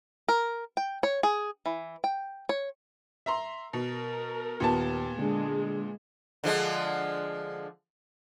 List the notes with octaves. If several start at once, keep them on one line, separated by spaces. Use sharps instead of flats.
A#4
G5
C#5
G#4
E3
G5
C#5
E5 A#5 C6
B2 A#4
D#2 A#2 B3 A5
D3 G#3
D3 F3 G#3